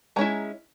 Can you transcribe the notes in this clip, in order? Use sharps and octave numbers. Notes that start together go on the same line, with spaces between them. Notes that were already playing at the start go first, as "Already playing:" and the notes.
G#3 C#4 E4 A#5